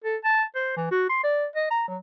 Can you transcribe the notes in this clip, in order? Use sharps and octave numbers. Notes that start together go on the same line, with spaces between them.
A4
A5
C5
E3
F#4
C6
D5
D#5
A#5
F#3